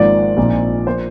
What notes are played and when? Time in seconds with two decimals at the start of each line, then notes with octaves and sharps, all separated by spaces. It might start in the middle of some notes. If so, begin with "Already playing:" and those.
Already playing: G#1 G#2 F3 A#3 D5
0.37 A#1 A#2 F3 C4 D#4
0.87 F3 A#3 C5